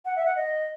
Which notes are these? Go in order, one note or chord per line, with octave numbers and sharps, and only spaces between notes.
F#5
E5
F#5
D#5